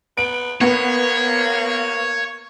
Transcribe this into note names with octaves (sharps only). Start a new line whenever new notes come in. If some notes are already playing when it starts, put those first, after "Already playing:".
B3 D7
A#3 B3 C#5